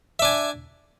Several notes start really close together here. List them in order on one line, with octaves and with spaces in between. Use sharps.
E5 D4 G#5